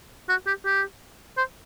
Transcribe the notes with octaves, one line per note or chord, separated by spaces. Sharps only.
F#4
G4
G4
C5